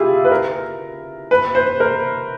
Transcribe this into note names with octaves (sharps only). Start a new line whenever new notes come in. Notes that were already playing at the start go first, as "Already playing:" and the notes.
Already playing: E4 F4 G4 G#4
B4
A#4
B4
C5
A#4